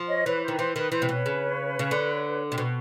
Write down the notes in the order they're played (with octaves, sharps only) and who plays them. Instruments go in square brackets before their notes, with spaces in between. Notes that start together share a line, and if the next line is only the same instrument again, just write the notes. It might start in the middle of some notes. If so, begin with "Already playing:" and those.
Already playing: [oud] F3
[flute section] C#5 D#5
[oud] E3 [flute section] B4 C#5
[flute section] C5
[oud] D#3
[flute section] B4
[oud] E3 [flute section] C5
[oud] D#3 [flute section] B4
[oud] E3 [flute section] C5
[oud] C3
[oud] B2 [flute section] B4 C#5
[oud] C#3
C#3
D3
C3
B2